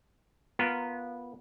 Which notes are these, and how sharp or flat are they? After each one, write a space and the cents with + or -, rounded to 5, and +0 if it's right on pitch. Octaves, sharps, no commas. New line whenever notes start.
B3 -10 F4 +0 A#4 +0